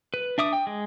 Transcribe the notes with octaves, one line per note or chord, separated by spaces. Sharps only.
B4
D4 E5 D6 D#6
G5
G#3